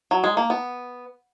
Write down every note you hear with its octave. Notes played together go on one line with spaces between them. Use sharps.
F#3
G#3
A#3
B3